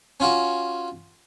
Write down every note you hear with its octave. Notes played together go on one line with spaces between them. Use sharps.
C#4 F4 F#4